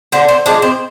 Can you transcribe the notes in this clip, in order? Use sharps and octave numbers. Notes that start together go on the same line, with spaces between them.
D3 C4
C4
F3 G#3 D4
C4